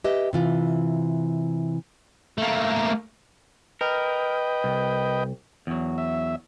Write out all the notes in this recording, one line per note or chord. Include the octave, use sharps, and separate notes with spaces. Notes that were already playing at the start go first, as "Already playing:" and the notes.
G4 B4 D#5 E5
C3 E3 F4
A3 A#3
A#4 B4 D#5 G5
C2
E2 F#3
E5